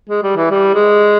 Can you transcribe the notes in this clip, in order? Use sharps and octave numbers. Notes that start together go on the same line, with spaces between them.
G#3
G3
E3
G3
G#3